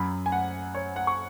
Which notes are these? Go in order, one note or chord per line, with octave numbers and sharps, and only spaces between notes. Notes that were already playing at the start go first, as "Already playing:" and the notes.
Already playing: F#2 F#3 B5
G#5
F#5
C#5
F#5
C#6